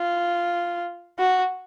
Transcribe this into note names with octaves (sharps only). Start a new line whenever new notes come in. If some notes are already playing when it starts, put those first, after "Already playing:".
Already playing: F4
F#4